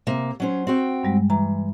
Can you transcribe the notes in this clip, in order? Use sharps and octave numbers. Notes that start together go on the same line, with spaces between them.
C3 A#3
F#3 C#4 C5
C4 F#4 G5
G2 G3 G#3
E3 A#5